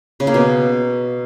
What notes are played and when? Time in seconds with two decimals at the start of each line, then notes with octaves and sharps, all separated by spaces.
0.20 C#3
0.27 A#3
0.34 B2